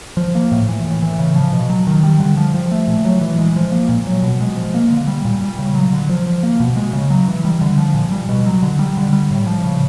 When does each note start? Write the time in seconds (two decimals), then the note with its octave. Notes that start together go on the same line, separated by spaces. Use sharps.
0.17 F3
0.35 A#3
0.52 A2
0.68 E3
0.85 A2
1.02 E3
1.19 C#3
1.36 F3
1.52 B2
1.69 F#3
1.87 D#3
2.03 G3
2.20 D3
2.37 F3
2.54 F3
2.72 A3
2.88 A#2
3.05 F#3
3.21 E3
3.38 G#3
3.56 F3
3.72 A#3
3.89 A#2
4.07 F#3
4.23 B2
4.41 G#3
4.56 F3
4.74 A#3
4.90 D3
5.07 G3
5.25 A#2
5.41 G3
5.59 C#3
5.75 F#3
5.92 D3
6.09 F3
6.27 F3
6.43 A#3
6.60 B2
6.76 G#3
6.93 C#3
7.10 F#3
7.28 E3
7.45 G3
7.61 D3
7.78 F3
7.94 A#2
8.12 G3
8.29 B2
8.46 F#3
8.62 D3
8.79 G3
8.97 D3
9.13 G3
9.31 A2
9.47 F3
9.64 C#3